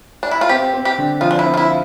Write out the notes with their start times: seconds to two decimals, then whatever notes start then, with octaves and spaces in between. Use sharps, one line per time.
0.23 D4
0.31 E4
0.41 F4
0.49 C4 G4
0.74 C4
0.85 G4
0.98 D3
1.21 F3 F4
1.31 D4
1.39 E4
1.46 C4
1.54 F4
1.57 E4
1.69 F4